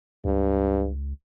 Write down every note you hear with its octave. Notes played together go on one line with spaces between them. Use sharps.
C#2 G2